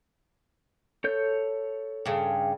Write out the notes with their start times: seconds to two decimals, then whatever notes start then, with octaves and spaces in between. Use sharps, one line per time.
1.04 A4 C#5 G6
2.06 G2 C#3